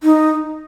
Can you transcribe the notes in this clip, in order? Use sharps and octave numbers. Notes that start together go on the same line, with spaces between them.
D#4